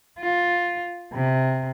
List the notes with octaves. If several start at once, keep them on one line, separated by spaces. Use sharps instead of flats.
F4
C3